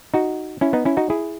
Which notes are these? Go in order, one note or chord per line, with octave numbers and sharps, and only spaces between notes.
D#4 F#4
C#4 E4
B3 D#4
C#4 E4
D#4 F#4
E4 G#4